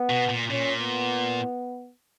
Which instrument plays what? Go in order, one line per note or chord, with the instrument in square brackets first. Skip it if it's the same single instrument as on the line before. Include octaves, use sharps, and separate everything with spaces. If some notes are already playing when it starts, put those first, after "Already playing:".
Already playing: [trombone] B3
[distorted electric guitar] B2
A#2
[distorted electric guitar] A#2 [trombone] C#4
[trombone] B3